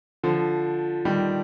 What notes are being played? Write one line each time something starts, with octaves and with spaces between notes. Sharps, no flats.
D3 F3
D#3 G3